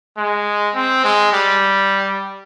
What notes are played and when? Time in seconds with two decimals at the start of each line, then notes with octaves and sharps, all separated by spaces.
0.17 G#3
0.75 C4
1.04 G#3
1.33 G3